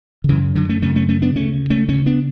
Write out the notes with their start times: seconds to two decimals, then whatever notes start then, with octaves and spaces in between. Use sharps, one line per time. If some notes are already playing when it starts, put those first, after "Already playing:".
0.24 D3
0.29 F#2 C#3 E3
0.55 D3 F#3
0.69 A3 C#4
0.82 F#2 C#3 A3 C#4
0.95 A3 C#4
1.09 A3 C#4
1.22 B3 D4
1.35 D2 C#3 A3 C#4
1.70 A3 C#4
1.88 D2 C#3 A3 C#4
2.06 B3 D4